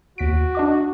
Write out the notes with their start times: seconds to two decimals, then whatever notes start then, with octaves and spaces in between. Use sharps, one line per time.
0.18 D#2 F#4 B6 D7
0.55 D4 D#5 D6